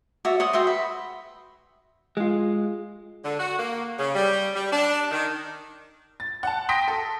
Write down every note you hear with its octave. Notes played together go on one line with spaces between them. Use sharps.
F#4 C#5 D5 E5
C#5 F#5 C6 D#6
F#4 E5 G5 C6
B4
G#3 F4
D3
F#4
A#3
C#3
G3
G3
D4
D#3
A6
F#5 A5
G5 C6 D#6 A#6 B6 D7
A4